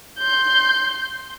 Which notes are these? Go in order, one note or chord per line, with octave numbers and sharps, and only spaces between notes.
C6 G6